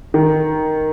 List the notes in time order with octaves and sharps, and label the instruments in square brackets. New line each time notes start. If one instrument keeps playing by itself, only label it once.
[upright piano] D#3